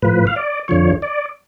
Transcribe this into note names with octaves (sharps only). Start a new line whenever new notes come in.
A2 F3 B4
F5
D5
F2 D3 F3 C#5
D5